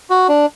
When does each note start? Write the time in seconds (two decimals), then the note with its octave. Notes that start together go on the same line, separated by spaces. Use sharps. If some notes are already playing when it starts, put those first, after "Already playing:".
0.10 F#4
0.29 D4